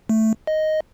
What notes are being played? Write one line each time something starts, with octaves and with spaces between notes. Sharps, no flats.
A3
D#5